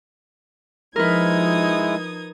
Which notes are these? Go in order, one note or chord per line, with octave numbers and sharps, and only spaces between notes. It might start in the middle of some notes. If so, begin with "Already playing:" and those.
F3 G#3 D#4 E4 A#4 B4 D#6 G#6